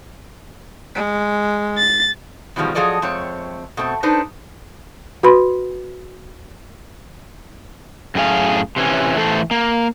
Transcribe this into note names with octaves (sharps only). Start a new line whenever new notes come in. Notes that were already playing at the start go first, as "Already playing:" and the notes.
G#3
A6
E2 B2 D#3 F3 G3 G#3
F3 F#3 G#4 A4 D5 D#5
F2 G#3 A3 C4 C#5
B2 A3 C4
D4 D#4 A4 B4 C5
F#4 B4 B5 C6
F#2 A2 G#4 F5
C3 E3 C#4
E3 A3 A4 B4 C5
A#3